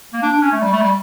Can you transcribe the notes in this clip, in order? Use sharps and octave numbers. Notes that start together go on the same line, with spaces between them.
A#3
D4
D4
C#4
A3
G3
A3
G3